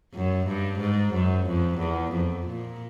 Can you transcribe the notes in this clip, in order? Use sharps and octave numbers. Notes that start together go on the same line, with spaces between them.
F#2
G2
G#2
F#2
F2
E2
F2
A#2